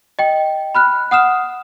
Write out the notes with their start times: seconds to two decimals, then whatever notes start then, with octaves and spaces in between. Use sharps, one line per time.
0.19 D#5 G5
0.75 B5 F6 F#6
1.11 F#5 D#6 F6 E7